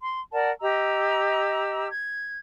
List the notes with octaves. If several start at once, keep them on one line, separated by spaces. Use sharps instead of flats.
C6
A#4 D5 F#5 A5
G4 D#5 A#5 E6
G#6